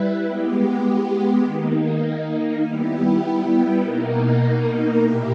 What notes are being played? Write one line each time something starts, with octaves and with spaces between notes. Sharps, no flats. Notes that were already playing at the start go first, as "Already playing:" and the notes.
Already playing: G3 E4 B4
G#3 B3 G4
D#3 A#3 D#4
G3 B3 E4 G4
B2 A#3 D#4 A#4
A#2 A#3 E4 G4